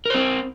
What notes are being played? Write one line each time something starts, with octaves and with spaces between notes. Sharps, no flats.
C4 A#4 C5